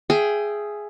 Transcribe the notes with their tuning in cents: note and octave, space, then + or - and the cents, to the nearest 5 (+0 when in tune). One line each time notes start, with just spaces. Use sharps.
G#4 +5 E5 +25 G5 +0